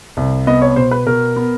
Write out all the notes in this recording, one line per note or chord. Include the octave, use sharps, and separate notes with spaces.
C2
B3 D#5
C#5
B2 C5
B4
B2 A#4
B3